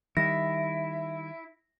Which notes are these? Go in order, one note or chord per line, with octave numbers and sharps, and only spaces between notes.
D#3 G3 E4 A#6